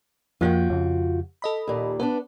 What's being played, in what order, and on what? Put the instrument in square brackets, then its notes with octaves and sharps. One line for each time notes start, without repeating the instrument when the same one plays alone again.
[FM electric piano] F2 F3 A#3 [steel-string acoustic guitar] F4 F#4 G5
[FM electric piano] F2 C#3
A4 D#5 B5
[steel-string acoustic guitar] D#2 A#2
[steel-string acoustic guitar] B3 C#4 D4 [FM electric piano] B4